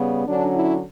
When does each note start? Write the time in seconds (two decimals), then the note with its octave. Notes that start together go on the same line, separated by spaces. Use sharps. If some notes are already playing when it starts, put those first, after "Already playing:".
Already playing: C#3 G3 B3
0.26 D3 F#3 C#4 D4
0.55 E4